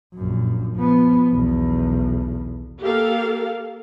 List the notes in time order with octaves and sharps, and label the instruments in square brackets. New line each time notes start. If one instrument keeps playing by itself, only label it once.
[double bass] A#1 F#2
F3 B3
B1 E2
[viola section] A#3 G4 A4 A#4 F5